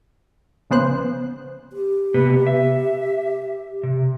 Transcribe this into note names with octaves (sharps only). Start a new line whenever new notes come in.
A#1 C#3 B3 C5 F#6
G4
C3 B3 B4
E5
C3